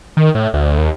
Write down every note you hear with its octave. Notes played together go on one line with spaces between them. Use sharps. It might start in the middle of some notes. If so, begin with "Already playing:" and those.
D#3
A2
D2
D#2